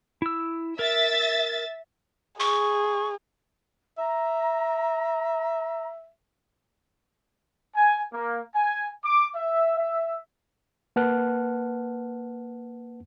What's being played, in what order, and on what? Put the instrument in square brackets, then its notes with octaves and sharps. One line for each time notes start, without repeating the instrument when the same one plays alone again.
[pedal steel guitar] E4 E6
[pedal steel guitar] A#4 [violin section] E5 A6
[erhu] G#4 [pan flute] C#6
[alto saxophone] E5 [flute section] A#5
[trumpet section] G#5
A#3
G#5
D6
E5
E5
[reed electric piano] A#3 B4 F#5 A5 F6 F#6